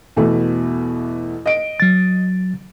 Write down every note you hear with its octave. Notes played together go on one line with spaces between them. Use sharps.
E2 B2 A3
D#5 D7
F#3 A6